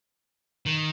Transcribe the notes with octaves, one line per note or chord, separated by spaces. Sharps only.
D#3